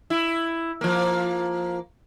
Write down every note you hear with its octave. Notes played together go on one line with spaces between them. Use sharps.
E4
F3 A#3